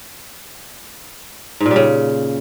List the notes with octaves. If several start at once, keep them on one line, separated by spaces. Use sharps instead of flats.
G#2
A#2
G3
C#3